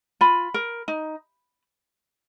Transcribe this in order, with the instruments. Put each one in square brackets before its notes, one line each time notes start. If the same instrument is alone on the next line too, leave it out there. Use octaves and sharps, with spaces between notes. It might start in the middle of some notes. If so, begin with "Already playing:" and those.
[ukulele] F4 B5
A#4
D#4